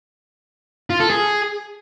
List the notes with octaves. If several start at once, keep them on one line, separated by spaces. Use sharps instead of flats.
F4
A4
G#4